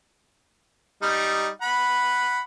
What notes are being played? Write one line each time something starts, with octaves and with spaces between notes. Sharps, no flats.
G3 D#4
F#5 B5